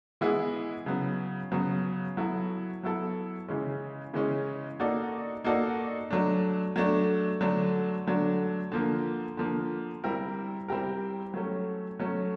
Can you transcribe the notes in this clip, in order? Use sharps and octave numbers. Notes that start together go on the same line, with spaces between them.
E3 G#3 B3 E4 G#4
C#3 F#3 B3
C#3 F#3 B3
F#3 B3 E4 A4
F#3 B3 E4 A4
C#3 E3 G#3 C#4
C#3 E3 G#3 C#4
A#3 D#4 F#4 A4 D5
A#3 D#4 F#4 A4 D5
F#3 A3 D4
F#3 A3 D4
D3 F#3 A3 D4
D3 F#3 A3 D4
D3 F3 A#3
D3 F3 A#3
G3 C4 E4 G4 A#4
G3 C4 E4 G4 A#4
F#3 A3 C#4
F#3 A3 C#4